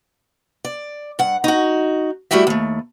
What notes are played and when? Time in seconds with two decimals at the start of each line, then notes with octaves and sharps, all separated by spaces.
0.65 D5
1.19 G2 F#5
1.44 D#4 F#4
2.31 G3 A3 E4 F#4 G4 E5
2.47 D#2 A3